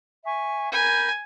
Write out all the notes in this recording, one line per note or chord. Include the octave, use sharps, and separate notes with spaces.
E5 G#5 C#6
A#4 G#5 B5 G6